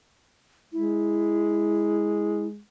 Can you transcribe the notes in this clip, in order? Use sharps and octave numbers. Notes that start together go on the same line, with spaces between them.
G#3 E4